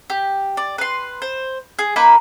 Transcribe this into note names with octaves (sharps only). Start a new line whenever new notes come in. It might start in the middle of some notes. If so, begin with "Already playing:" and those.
G4
D5
B4 C6
C5
G#4
A#3 D#4 B4 B5